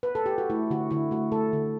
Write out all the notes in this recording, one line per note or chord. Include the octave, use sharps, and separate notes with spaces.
B4
A4
G4
F#4
A3 E4
D3 F#4
D3 E4
A3 F#4
A3 A4
D3